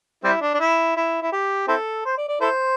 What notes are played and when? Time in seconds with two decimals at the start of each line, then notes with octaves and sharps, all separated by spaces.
0.24 G3 C4 E4
0.42 D4
0.54 D4
0.60 E4
0.96 E4
1.22 E4
1.32 G4
1.68 C4 E4 A4
2.06 C5
2.17 D5
2.29 D5
2.41 E4 A4 C5